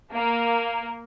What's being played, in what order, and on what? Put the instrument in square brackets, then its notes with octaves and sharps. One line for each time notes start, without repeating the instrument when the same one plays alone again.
[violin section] A#3